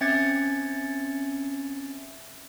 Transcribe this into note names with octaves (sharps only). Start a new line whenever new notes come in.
C4 C#4 E5 G#6 A6 C#7